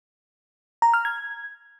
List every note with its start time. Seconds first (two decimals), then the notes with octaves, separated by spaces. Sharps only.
0.82 A#5
0.94 F6
1.05 G#6